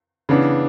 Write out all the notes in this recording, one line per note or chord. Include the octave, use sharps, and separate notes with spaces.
C#3 E3 B3 D4